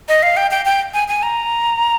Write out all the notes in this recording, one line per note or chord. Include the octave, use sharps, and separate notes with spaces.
D#5
F5
G5
G5
G5
G#5
G#5
A#5